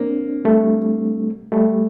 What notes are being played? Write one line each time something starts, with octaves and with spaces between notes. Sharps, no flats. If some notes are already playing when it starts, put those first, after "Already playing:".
Already playing: A#3 C4 D4
G3 A3
G3 A3